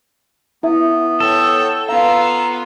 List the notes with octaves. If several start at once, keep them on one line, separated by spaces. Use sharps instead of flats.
B3 E4 E5
A4 C#5 G5
B3 F4 F5 A#5